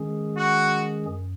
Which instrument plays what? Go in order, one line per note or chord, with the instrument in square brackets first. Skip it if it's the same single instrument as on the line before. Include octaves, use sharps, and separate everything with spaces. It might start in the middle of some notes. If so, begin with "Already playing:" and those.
Already playing: [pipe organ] D#3 G#3 C#4 G#4
[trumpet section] F#4
[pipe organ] F#2